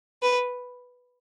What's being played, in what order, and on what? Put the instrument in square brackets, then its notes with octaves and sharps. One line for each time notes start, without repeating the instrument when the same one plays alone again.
[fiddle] B4